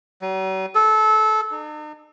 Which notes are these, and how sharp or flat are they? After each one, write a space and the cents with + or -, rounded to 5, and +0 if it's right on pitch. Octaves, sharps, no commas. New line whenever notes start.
F#3 +45
A4 -20
D#4 -45